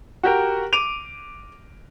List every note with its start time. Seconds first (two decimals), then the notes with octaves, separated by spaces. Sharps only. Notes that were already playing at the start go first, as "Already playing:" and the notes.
0.23 F#4 G4 A#4
0.73 D6 D7 D#7 F7